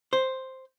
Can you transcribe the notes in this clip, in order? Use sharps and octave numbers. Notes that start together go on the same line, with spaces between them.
C5